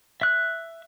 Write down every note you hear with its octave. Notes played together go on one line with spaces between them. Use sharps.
E5 F#6